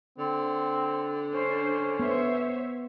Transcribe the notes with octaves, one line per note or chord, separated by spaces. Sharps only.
D3 C4
C#4 D4 C5
B3 C5 C#5 E5